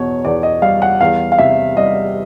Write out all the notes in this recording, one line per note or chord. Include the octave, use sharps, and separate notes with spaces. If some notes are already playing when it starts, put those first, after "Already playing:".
Already playing: E2 B2 C#5
E2 D5
D#5
G3 F5
F#5
E2 F5
F5
C3 E5
G3 D#5